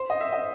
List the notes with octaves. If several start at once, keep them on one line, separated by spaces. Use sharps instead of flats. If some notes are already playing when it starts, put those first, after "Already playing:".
Already playing: C5
D#5
E5
D#5